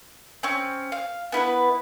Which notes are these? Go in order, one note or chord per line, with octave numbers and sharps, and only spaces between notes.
C4 C#4
F5
B3 E4 A#4 B4